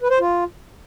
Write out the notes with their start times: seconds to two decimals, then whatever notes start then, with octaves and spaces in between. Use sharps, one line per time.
0.01 B4
0.10 C5
0.20 F4